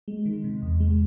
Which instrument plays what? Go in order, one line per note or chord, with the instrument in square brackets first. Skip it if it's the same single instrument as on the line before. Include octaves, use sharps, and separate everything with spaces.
[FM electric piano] G#3
D#3
C3
E2
G#3